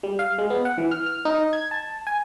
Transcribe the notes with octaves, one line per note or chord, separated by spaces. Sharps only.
G3
F5
G#3
B3
F#5
E3
F6
F6
D#4
G#6
A5
G#5